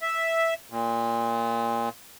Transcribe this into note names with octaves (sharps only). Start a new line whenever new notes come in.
E5
A#2